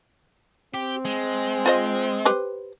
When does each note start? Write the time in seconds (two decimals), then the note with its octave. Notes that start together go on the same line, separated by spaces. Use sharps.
0.74 C4 G4
1.05 G#3
1.66 F4 C5 D#5
2.25 G4 B4 C5